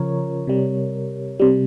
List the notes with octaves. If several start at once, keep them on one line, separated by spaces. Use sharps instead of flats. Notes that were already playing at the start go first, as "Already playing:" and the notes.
Already playing: C#3 F3 A#4 C#5
C3 G3
C3 G3